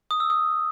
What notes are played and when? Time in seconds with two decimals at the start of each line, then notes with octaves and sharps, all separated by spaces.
0.11 D#6
0.20 E6
0.30 D#6